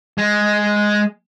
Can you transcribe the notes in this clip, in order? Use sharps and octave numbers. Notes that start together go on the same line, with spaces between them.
G#3